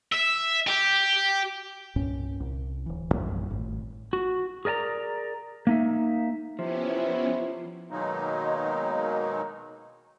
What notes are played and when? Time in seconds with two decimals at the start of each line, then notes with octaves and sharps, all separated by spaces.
0.12 E5
0.67 G4
1.96 C2 G2 A#2 C#4
2.40 C2
2.86 D1 E3
3.14 A#1 F#2 A#2 G3
3.50 G#1 A2
4.13 F#4
4.65 G#4 A#4 D5 G#5 A#5
5.67 A#3 D#4 E5
6.59 C3 F3 B3 C#4 E4
7.91 B2 D#3 F#3 G#3 A#3 D#4